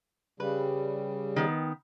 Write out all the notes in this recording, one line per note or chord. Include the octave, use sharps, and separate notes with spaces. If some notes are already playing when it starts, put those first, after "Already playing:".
C#3 G3 B4
D#3 B3